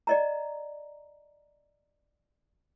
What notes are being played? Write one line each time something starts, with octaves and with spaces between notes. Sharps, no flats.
D5 D#5 A#5